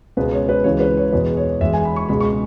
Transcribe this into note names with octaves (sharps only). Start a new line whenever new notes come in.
C#2 B2 G#3 B4
C#5
B4
C#2 C#3 E3 G#3 C#5
B4
C#5
E2 B2 G#3 B4
C#5
E1 E2 E3 G#3 E5
G#5
B5
C#6
C#2 B2 G#3 B5
C#6